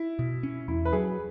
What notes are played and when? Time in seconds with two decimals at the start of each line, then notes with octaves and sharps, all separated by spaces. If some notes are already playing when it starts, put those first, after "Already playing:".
Already playing: E4
0.19 B2
0.43 C#4
0.68 E2 E4
0.85 B4
0.93 F#3 G#4